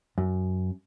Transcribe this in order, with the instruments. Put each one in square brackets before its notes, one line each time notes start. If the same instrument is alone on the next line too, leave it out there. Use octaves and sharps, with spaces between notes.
[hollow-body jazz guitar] F#2